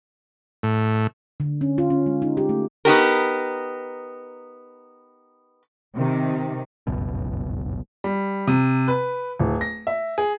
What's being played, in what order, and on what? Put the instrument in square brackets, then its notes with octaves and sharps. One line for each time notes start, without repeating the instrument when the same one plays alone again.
[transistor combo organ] A2
[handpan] D3
C#4
F4
C#4
G#3
D#4
G4
A3
[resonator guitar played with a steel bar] B3 D#4 G4 A#4
[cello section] C3 D#3
[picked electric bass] G1 C#2 F#2 B2
[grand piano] G3
C3
B4
D1
A#6
E5
G#4